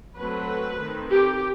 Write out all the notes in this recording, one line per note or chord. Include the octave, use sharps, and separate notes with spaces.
F#3 A3 C4 B4
D#3 A3 C4
G4